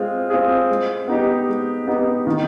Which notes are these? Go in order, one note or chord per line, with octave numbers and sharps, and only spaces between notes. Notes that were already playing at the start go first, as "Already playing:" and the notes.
Already playing: G#3 C4 F4 G#4
C4 F4 G#4
G#3
B3 D#4 G4
G#3
B3 D#4 G4
D#3